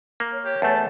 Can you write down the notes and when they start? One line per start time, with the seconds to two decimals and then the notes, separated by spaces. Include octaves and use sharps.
0.20 A#3
0.33 C#5
0.45 G4
0.62 E2 A3 A5